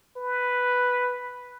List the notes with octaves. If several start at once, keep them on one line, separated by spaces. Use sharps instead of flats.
B4